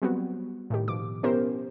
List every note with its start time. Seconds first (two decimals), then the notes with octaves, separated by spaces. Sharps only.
0.02 F#3 G3 B3 C4 F#4
0.70 A2 D#3 G4
0.88 B2 D#3 F3 D6
1.23 B3 C#4 E4 G4 A#4 C5